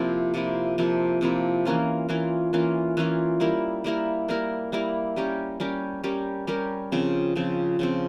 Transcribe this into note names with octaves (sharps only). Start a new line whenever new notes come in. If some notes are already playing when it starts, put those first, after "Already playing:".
Already playing: C3 F3 A#3 E4
C3 F3 A#3 E4
C3 F3 A#3 E4
C3 F3 A#3 E4
E3 A#3 C#4 F4
E3 A#3 C#4 F4
E3 A#3 C#4 F4
E3 A#3 C#4 F4
G3 A#3 E4 A#4
G3 A#3 E4 A#4
G3 A#3 E4 A#4
G3 A#3 E4 A#4
G3 C#4 G4 A#4
G3 C#4 G4 A#4
G3 C#4 G4 A#4
G3 C#4 G4 A#4
C#3 F3 C4
C#3 F3 C4
C#3 F3 C4